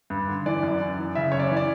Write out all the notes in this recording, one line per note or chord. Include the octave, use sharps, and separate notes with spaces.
G2
D3
E3 D5
F#2
F#2
E3
C#3 E5
F#2 C#5
D5
E3
D5